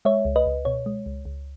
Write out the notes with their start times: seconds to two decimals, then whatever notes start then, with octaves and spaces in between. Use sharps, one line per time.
0.05 G#3 C#5 E5
0.25 C#2
0.36 B4 D#5
0.46 C#2
0.65 B2 C#5
0.86 G#3
1.06 C#2
1.25 C#2